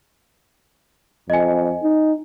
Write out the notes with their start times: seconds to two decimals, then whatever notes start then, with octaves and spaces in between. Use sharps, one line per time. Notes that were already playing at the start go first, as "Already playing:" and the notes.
1.30 F2 D#5 G#5
1.83 D#4